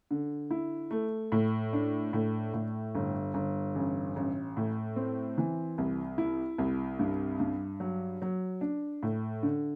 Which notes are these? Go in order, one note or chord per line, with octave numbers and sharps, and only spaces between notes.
D3
E4
A3
A2
D4
A2
A2
G1
G1
A1
A1
A2
C4
E3
C2
E4
C2
G2
G2
F#3
F#3
D4
A2
D3